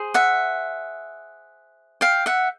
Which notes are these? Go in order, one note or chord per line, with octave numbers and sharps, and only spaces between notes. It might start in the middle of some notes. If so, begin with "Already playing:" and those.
Already playing: G#4 C5
E5 F#5
F5 G5
E5 F#5